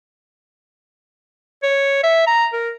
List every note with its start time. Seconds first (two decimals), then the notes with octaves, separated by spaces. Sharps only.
1.63 C#5
2.03 E5
2.27 A#5
2.53 A#4